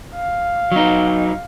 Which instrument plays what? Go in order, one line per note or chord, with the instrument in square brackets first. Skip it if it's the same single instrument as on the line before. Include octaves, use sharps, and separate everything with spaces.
[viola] F5
[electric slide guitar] F#3 D#4